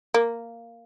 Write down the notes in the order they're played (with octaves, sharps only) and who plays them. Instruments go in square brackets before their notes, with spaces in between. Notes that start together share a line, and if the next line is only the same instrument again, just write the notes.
[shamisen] A#3